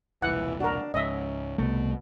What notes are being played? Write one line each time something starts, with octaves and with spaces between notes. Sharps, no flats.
E1 C2 A#2 E3 F#5
D4 F#4 A#4
C#2 G#2 C#4 D#5 E5
C2 B2 A3 B3